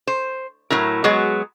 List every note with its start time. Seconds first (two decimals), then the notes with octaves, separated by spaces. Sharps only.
0.07 C5
0.70 A2 F#3 E4 A#4
1.04 F#3 G#3 B3 F#4 G#4